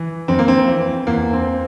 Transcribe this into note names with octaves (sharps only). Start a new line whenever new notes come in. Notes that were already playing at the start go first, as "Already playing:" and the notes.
Already playing: E3
F2 C4
A#3
C4
E3
E2 A#3
C4